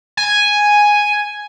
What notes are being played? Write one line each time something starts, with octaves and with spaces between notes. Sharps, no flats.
G#5